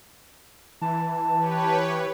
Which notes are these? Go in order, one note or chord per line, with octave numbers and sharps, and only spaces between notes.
E3 A5
G4 B4 C#5